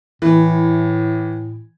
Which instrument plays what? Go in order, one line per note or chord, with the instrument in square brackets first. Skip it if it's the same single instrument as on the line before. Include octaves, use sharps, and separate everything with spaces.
[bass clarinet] A2 [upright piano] E3